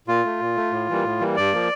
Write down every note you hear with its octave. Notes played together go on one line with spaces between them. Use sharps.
A#2 F4
A3
A#2
A3
A2
E3 G3 A#3
A2
E3 G3 A#3
G2 D5
F3 A#3